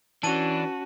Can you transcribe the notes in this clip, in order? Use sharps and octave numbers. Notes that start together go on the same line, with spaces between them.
E3 C#4 D4 F#4 A5 D#7